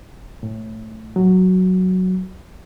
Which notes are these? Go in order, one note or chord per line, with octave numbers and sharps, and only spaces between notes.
A2
F#3